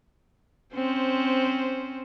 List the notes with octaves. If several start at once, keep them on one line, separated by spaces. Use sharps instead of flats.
C4 C#4 C5